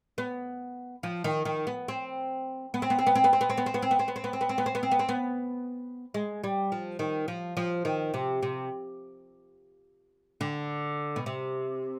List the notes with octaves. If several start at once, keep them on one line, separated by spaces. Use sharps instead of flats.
B3
F3
D#3
D#3
B3
C4
B3
C4
B3
C4
B3
C4
B3
C4
B3
C4
B3
C4
B3
C4
B3
C4
B3
C4
B3
C4
B3
C4
B3
C4
B3
C4
B3
C4
B3
G#3
G3
F3
D#3
F3
F3
D#3
C3
C3
D3
B2
C3